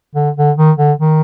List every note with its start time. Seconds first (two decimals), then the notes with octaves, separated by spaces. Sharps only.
0.15 D3
0.36 D3
0.57 D#3
0.78 D3
0.99 D#3